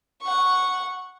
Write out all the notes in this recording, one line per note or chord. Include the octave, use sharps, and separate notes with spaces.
F#5 C#6